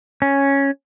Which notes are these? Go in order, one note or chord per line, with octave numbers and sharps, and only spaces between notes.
C#4